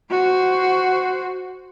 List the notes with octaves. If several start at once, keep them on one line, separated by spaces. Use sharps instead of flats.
F#4 C5